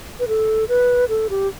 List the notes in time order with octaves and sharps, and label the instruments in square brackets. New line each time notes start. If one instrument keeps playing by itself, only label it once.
[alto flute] B4
A4
B4
A4
G4